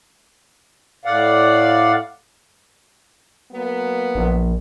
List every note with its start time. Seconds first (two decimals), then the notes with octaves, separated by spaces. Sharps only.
1.05 A2 D5 F5 F#5
3.52 F#3 A#3 B3
4.15 A#1